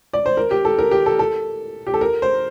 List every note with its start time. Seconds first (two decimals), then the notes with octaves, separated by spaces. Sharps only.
0.13 D5
0.26 C5
0.37 A#4
0.51 G4
0.65 A4
0.79 A#4
0.91 G4
1.06 A4
1.19 A4
1.87 G4
1.94 A4
2.01 A#4
2.22 C5